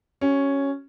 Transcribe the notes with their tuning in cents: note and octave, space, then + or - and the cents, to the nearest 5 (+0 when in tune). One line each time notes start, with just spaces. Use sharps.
C#4 +0 F#4 +35